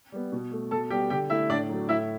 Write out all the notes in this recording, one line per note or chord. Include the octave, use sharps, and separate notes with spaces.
G3 B3
B2
A3
B2 A4 A5
G3 B3 G4 G5
D3 G4 G5
A3 E4 E5
A2 D4 D5
F#3 A3
A2 E4 E5